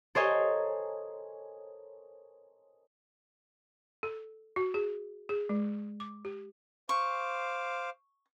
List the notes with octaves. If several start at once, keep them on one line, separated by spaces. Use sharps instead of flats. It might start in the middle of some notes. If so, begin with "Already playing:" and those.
A4 A#4 C5 C#5 D#5 G#5
A4
F#4
G#4
G#4
G#3
D6
G4
C5 F5 C#6 D6